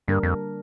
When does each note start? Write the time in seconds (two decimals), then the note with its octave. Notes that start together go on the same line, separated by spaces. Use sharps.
0.08 G2 D3 G3 A#3 D4 A#4
0.23 F2